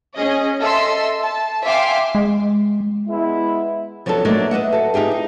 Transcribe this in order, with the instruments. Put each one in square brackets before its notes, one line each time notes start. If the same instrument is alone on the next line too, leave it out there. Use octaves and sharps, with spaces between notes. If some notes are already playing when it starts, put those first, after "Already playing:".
[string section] C#4 G#4 D#5
A4 D#5 E5 C6 E6
A5
E5 F5 G5 G#5 C6 D6
[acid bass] G#3
[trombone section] G#3 B3 E4
[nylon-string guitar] F3 F#3 B3 D4 A4
F#3 A3 A#3 D4 D#4
B4 D#5 E5 F#5
F#4 A4
D#4 F4 G4 G#4
D#4